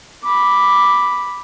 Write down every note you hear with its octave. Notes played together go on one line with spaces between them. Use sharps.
B5 D6